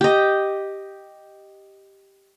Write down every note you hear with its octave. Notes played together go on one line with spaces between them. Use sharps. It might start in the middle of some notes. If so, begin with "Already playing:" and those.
G4 D#5